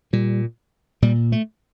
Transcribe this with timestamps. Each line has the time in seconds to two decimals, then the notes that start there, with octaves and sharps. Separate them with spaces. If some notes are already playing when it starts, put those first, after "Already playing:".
0.13 A#2 G3
1.02 A#2 G3
1.32 A3